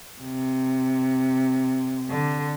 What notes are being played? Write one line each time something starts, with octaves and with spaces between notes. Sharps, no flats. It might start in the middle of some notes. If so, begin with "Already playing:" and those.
C3
D3